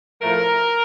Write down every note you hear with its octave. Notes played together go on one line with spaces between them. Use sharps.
A2 F3 A3 A#4